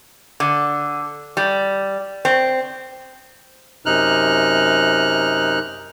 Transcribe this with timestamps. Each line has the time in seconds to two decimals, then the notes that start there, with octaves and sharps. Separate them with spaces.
0.40 D3
1.37 G3
2.25 C4
3.86 F#2 C3 D#4 F6 F#6